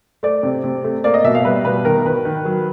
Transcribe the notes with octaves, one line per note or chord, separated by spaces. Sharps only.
A3 D5
C3
C3
A3
A#3 D5
D#5
B2 E5
F5
G3 B4
B2 B4
D#3 A#4
D#3 B4
D#3
F#3